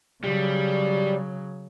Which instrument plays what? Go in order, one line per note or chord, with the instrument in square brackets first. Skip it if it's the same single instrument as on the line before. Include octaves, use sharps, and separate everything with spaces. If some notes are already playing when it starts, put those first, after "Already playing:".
[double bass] C#3 F#3 [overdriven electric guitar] G3